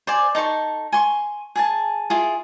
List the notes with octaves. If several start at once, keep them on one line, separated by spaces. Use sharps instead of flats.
C5 D5 G#5
D#4 A4 C6 C#6
G#5 C6 C#6
G#4 G#5 A5
E4 F4 G#4